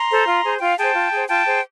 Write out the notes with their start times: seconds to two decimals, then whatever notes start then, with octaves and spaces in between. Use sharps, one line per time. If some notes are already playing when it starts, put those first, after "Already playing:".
Already playing: A#5 C6
0.10 A4 C5
0.27 F4
0.44 G#4 C5
0.60 F4 F5 G5
0.78 G#4 C5 G5 A5
0.95 F4
1.12 G#4 C5
1.29 F4 G5 A5
1.46 G#4 C5